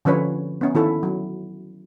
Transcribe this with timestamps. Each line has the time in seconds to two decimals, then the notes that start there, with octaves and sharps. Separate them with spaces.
0.05 D3 F3 C#4 B4 C#5
0.61 B3 C#4
0.75 D#3 E4 A4
1.03 F#3